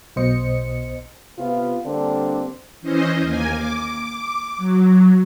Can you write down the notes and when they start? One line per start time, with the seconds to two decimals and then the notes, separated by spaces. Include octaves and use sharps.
0.16 B1 B2 C5 D#5 C#7
1.39 C3 B3 F4
1.85 D3 G3 A#3 C4 D4
2.81 E3 C#4 C5 D#5
3.20 D#2 A#3 G#5
3.52 D6
4.57 F#3